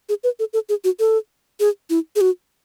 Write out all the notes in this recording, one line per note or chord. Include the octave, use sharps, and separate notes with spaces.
G#4
B4
A4
A4
G#4
F#4
A4
G#4
E4
G#4
F#4